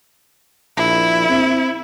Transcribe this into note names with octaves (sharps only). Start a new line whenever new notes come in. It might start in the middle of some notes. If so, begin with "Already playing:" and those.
A#1 E4
C4